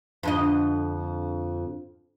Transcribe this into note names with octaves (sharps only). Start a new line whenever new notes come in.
F2 D3 D#5